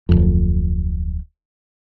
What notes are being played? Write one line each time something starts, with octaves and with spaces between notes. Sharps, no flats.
D1 G1 F2